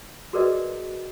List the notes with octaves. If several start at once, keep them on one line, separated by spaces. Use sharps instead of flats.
F#4 G#4 A#4 B4 D5 D#5